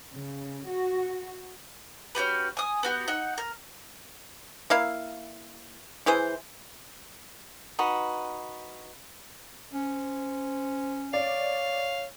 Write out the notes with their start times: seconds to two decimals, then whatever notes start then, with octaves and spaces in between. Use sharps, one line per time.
0.12 C#3
0.67 F#4
2.15 C#4 F#4 G4 B4
2.57 G#5 D#6
2.83 B3 F#4 G4
3.08 D#4 F#5
3.38 A#4
4.70 A#3 E4 F5
6.06 E3 E4 G#4 C5
7.79 D#4 F#4 B4
9.74 C#4 C5
11.14 C#5 D5 F5